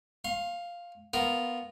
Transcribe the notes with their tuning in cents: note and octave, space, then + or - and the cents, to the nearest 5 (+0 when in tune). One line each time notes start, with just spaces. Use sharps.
F5 +0 C6 +35
B3 +0 F4 +0 A#4 +0